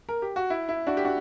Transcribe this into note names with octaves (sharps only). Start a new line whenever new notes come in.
A#4
G4
F#4
E4
E4
D4 F#4
G4
D4 F#4